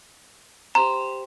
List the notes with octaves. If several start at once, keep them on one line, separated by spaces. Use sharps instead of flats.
G4 C5 A#5